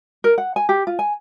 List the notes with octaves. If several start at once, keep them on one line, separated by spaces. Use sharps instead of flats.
A#4
F#5
G#5
G4
F4
G#5